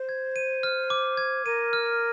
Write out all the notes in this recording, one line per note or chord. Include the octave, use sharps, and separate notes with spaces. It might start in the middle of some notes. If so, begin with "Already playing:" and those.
Already playing: C5
G#6
D#7
F6
D6
G#6
A#4 D#7
F6